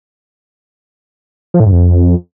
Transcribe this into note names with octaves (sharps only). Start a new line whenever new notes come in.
F3
A2
G2
F2